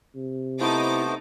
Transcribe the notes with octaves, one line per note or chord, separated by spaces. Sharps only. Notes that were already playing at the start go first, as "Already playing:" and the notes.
C3
A3 B3 D#4 E4 A4 C5 D6